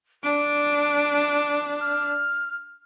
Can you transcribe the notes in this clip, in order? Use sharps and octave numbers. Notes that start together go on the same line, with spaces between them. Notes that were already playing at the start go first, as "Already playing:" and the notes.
D4 D7
F6